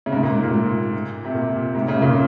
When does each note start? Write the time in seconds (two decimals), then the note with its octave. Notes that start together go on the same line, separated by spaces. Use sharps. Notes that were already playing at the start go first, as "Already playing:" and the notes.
0.06 C#3
0.12 G#2 C3
0.23 A#2
0.33 G#2
0.43 A#2
0.53 G#2
1.25 C3
1.35 A#2
1.75 G#2 C3
1.88 A#2 C#3
2.02 A#2 C#3